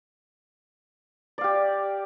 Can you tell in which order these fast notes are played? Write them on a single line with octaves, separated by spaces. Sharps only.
D5 F5 G4